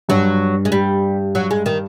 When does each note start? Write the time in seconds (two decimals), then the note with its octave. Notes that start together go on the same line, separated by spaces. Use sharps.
0.09 G2 F#3
0.65 G#3
0.72 G3
1.35 F#3
1.51 G#3
1.66 D#3